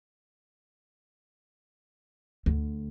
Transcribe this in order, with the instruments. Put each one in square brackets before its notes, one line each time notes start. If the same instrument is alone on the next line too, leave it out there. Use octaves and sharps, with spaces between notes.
[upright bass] D2